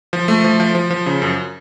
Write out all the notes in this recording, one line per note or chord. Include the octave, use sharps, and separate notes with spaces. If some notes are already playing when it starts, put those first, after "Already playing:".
F3
A3
F3
F3
F3
F3
C#3
F#2